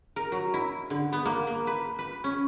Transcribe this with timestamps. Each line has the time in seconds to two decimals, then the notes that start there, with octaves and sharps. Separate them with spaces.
0.16 A#4
0.32 F#3
0.54 E4
0.90 D3
1.13 B3
1.25 A#3
1.47 A#3
1.67 B4
1.99 B4
2.24 C#4